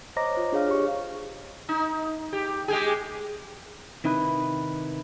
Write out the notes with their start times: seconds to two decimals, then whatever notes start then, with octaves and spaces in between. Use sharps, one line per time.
0.16 C5 C#5 D#5 A#5 D6 A#6
0.35 F4 C5
0.52 D4 G#4 C#5 F5 F6
0.68 G4 C#6
1.69 D#4
2.33 G4
2.68 G#3 G4 G#4
4.04 C3 D#3 D#4 E4 B4